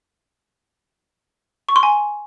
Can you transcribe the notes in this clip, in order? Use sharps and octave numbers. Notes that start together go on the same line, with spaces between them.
C#6
C6
G#5